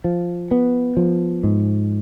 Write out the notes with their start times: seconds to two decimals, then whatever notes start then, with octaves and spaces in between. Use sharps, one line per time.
0.04 F3
0.51 B3
0.97 F3
1.43 G#2